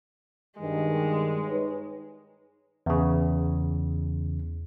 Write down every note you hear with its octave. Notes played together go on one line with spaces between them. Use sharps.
G2 D#3 G#3
D#4 B4 C#5
E2 C#3